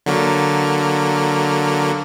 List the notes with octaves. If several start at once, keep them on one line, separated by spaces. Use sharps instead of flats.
D3 F#3 A#3